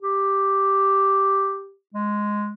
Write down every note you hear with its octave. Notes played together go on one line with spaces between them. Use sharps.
G4
G#3